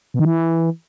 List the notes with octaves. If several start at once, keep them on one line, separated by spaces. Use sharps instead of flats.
B2
D#3
E3